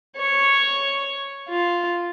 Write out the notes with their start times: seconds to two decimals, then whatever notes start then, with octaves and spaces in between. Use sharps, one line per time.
0.17 C#5
1.49 F4